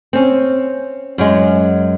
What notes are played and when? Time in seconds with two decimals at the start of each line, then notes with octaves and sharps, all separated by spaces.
0.13 C4 C#4
1.18 F#2 G#3